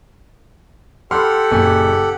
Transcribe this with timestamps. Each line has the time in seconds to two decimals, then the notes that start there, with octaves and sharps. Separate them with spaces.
1.11 G4 A4 F#5 B5 C6 F6
1.51 F#1 A#2 G#5